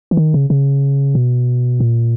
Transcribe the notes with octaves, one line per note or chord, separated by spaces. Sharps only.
E3
D#3
C#3
C#3
B2
A#2